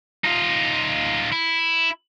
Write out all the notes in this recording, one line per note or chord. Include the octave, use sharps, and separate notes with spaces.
D#4 F4
E4